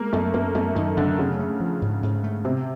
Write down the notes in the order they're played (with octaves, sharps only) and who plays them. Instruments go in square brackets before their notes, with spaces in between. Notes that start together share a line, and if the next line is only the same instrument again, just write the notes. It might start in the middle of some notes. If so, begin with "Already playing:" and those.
Already playing: [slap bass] G#3 [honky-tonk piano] A#3
[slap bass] F#2 [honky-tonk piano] A3
[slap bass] F#2 [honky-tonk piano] A#3
[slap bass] F#2 [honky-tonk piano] A3
[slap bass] F#2 [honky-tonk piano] D#3
[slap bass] F#2 [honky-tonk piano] D3
[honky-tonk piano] C#3 [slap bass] A3
[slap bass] A3
F3
G#2
G#2
A3
[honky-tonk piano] C3 [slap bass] C4